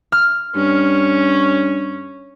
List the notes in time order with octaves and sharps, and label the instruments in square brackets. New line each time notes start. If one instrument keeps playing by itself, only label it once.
[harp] F6
[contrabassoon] G2 [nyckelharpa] C#4